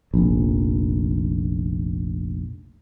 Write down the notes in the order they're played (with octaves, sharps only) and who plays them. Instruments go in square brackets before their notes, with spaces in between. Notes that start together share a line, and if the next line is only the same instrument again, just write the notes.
[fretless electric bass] F1 A#1